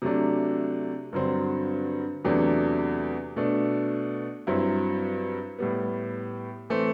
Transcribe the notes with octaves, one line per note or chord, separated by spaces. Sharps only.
C3 F#3 A3 D4
G2 D3 F#3 C4
E2 C3 F#3 A3 D4
B2 A3 D4
G2 F#3 C4 E4
A2 G3 B3
E3 A3 C4